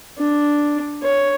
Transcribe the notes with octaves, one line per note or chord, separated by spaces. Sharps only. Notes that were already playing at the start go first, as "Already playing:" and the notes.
D4
C#5